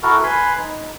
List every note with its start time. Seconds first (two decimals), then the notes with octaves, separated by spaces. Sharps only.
0.03 E4 F#4 A4 A#4
0.23 B4 G#5 B5 C6
0.58 D#4